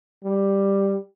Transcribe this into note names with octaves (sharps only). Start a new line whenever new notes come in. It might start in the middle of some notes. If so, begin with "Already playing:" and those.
G3